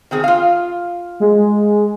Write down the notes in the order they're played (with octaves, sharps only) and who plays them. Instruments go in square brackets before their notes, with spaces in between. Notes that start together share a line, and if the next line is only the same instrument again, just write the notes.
[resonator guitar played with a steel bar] D#3 C4 G#4
F4 F5
[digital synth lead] G#3